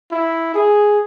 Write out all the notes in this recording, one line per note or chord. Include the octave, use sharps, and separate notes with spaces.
E4
G#4